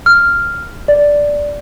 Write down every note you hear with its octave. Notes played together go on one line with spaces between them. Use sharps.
F6
D5